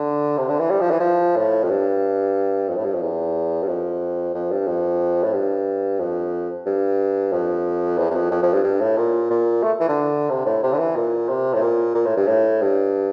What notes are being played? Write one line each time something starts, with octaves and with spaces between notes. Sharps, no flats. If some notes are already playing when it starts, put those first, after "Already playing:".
Already playing: D3
C3
D3
E3
G3
F3
E3
F3
A2
F2
G2
F2
A2
G2
F2
E2
G2
F2
F2
G2
F2
A2
G2
F2
G2
F2
E2
E2
F2
F2
F2
G2
G2
A2
A#2
A#2
A3
E3
D3
C3
A2
C3
D3
E3
A#2
C3
A2
A#2
A#2
A2
G2
A2
G2